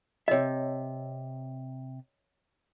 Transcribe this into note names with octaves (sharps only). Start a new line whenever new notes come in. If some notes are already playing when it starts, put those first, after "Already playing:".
C3 C#5 D#5 E5